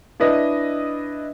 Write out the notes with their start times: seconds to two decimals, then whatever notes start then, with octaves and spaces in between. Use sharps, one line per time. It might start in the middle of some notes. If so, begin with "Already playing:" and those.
0.20 D4 E4 B4 D#5